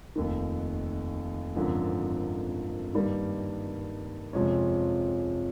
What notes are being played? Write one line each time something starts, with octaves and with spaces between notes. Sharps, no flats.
F1 D#2 D#3
G#1 F#2 D3 F3
G2 D#3 G3 A#3
F2 C3 F3 G#3 C#4